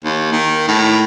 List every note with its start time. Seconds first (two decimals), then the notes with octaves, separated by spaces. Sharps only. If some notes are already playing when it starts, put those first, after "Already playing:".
0.04 D#2
0.32 D#3
0.68 A2